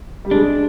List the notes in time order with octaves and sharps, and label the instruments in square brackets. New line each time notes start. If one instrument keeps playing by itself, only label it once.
[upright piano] G3
[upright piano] G#3 [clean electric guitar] D4